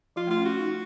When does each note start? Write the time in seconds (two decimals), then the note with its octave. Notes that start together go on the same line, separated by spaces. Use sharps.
0.16 F3 F4
0.27 A3
0.31 F4
0.38 C#4
0.45 F4 F#4
0.59 D#4